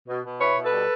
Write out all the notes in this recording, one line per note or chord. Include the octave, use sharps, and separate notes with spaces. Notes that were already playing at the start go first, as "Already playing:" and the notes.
B2
B2
E4 B4 C#5
B2
A4 B4
G3